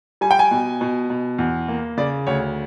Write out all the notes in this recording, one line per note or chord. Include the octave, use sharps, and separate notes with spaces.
G3 G#5
G5
G#5
B2
B2
B2
E2
A#3
C#3 D5
D2 C#5